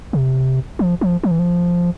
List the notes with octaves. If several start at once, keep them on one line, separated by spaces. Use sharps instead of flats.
C3
F3
F3
F3
E3
F3